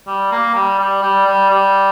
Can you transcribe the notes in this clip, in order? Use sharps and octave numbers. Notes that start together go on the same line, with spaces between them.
G3
A#3
G3
G3
G3
G3
G3